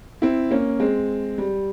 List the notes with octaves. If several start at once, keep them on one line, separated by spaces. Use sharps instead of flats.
C4 E4
A#3 C#4
G#3 C4
G3